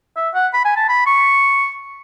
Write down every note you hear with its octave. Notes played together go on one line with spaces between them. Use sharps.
E5
F#5
B5
G#5
A5
B5
C#6